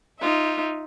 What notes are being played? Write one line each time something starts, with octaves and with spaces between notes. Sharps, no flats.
D#4 F4 E5